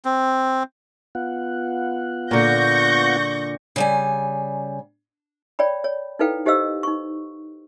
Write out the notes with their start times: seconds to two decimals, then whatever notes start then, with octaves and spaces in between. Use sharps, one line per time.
0.05 C4
1.15 B3 F4 F#5
2.31 A#2 D3 C#6 G6 A#6
3.76 C#3 G3 G#5
5.59 C#5 D5 G5 B5
5.84 C#5
6.19 D#4 E4 A4 B4 F5 G5
6.46 D#4 G4 C5 D#5 F5 E6
6.83 D#4 C#6